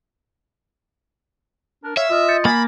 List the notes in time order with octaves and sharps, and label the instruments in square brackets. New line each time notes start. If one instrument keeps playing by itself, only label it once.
[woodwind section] D4 A#4
[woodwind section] C#5 F5 [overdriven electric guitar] E5
[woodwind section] F4 D#5 [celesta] E6 F6
[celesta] G6 A6 C#7
[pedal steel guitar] A#3 [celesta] G#5 A6 [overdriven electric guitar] B5